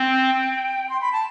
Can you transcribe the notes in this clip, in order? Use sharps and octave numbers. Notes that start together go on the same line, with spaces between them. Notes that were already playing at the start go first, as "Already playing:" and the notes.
Already playing: C4 G5
C6
B5
A5